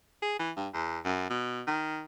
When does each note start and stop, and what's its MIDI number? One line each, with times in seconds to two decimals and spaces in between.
0.22 0.35 68
0.39 0.51 52
0.57 0.68 43
0.73 0.99 40
1.05 1.27 42
1.30 1.62 47
1.67 2.03 51